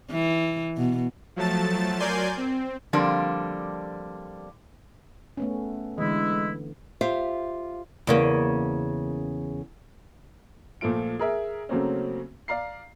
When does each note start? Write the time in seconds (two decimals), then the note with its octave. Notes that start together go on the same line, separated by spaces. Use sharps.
0.11 E3
0.77 B2
1.36 F3 F#3 A3 A5 A6
1.99 F#3 A#4 D5 G#5 C6 G6
2.37 C4
2.93 D3 F3 G3 A#3 C4 D4
5.37 A3 B3 C#4
5.98 D3 E3 G#3 E4
7.01 F4 G4 C5 E5 F5
8.07 E2 C#3 A#3
10.81 A#2 F3 A3 F4 D7
11.19 G#4 A#4 E5
11.69 C#3 F#3 A3 A#3 C4 C#4
12.48 D5 F5 A#5 C7